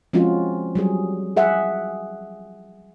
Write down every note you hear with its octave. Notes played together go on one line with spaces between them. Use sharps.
F3 G#3 C4 C#4 F4 F#4
F#3 G3 G#4
G#4 E5 F#5